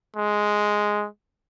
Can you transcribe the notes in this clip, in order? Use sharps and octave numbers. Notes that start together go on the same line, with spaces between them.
G#3